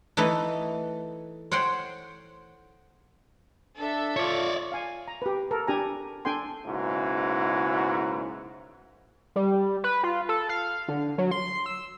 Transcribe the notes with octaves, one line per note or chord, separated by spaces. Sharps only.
E3 A3 D#4 A4 B4
C5 C#5 F#5 G5 C6
D4 A4 E5
F4 C#5 D5
F5 G#5
A#5
G4 B4
A4 A#4
D4 G4 G#5 A#5
D4 A4 G5 G#5 C6
B1 G#2 C#3 A#3 E4 F#4
G3
B4
F4
A4
F5
D3
F#3
C6
E6